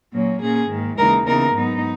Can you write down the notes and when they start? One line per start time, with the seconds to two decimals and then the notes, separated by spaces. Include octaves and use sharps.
0.13 A#2 F#3 A#3 C#4
0.42 A#2 A#3 C#4 G#4
0.70 G#2 D#3 A#3
0.98 D#2 C#3 E3 G#3 D#4 A#4
1.27 C#3 E3 B3 D#4 A#4
1.55 G#2 F#3 B3 D#4